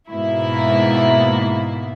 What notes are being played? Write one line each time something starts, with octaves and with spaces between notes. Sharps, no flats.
G#2 B2 A#3 E4